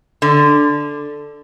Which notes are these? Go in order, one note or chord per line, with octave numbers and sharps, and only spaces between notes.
D3